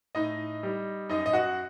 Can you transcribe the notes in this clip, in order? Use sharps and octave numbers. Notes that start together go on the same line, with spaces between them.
A2 D#4 D#5
G3
F#2 D#4 D#5
D#5
F#4 F#5